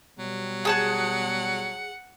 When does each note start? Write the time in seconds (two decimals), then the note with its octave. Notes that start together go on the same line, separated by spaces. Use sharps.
0.18 B2 F#3 G3
0.65 G#4 F#5 A5 F#6